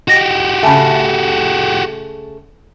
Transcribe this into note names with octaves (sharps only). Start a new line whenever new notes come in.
F#4 G4 D#5 A#6
C#3 A3 G#5 A5 B5